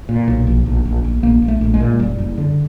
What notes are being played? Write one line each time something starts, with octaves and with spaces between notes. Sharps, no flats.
A#2
B1
A#1
A#1
A#1
A#1
A#1 A#3
A#1
A3
A#1
G#3
A#2
F#1 G3
F#1
D3